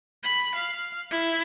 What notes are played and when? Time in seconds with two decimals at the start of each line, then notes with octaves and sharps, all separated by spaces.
0.23 B5
0.54 F5
1.10 E4